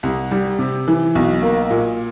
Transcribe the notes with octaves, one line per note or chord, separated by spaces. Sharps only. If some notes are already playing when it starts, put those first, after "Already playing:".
C2
G3
C3
E3
B1
A#3
A#2